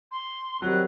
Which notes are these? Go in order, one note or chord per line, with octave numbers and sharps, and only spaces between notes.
C6
D#3 F#3 G3 C4 F#6